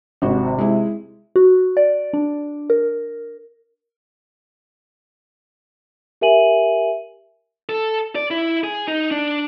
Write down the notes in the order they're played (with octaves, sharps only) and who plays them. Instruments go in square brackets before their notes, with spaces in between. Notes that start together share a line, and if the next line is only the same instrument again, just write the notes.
[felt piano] G#1 F#4 [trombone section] C3
[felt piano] G#3 E4
[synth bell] F#4
D5
D4
A#4
[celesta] G4 A#4 E5 G#5 D#7 F#7
[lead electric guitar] A4
D5
E4
G#4
D#4
D4